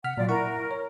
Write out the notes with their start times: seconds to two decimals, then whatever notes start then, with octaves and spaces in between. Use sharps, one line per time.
0.04 C3 F#5 F6 B6
0.17 A#2 F#3 F4 D5
0.29 E4 A#4 F#5 C#6
0.71 C#5